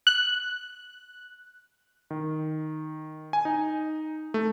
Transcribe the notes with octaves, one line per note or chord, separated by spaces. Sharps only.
F#6
D#3
G#5
D#4
A3